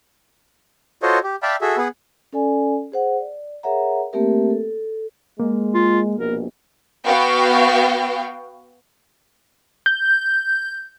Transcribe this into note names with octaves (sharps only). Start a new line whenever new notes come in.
F4 F#4 A4 C5 C#5 D#5
G4
D5 E5 F5 G5 A5 B5
F#4 G#4 A4 E5
B3 G#4 B4 F#5
C#4 A4 D5 G#5
G#4 C5 F#5
D5
G#4 A#4 C#5 E5 F#5 A#5
A3 A#3 C4 G4 A#4 E5
A4
G#3 A#3
F4
A#1 B2 A#4
B3 F#4 F5 G5
G6